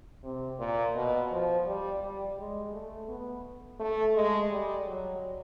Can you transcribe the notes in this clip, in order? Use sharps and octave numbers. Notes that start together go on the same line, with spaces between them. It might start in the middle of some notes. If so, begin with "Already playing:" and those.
C3
A#2
B2
F3
G3
G3
G#3
A3
B3
A3
G#3
G3
F#3